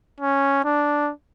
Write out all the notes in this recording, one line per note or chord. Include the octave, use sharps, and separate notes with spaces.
C#4
D4